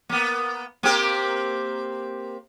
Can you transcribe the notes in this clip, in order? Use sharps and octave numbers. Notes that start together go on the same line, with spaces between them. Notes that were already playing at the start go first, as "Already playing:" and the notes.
A#3 B3
A#3 C4 G4